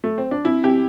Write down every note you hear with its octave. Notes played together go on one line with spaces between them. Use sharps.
A3
C4
D4
C4 E4
C4 G4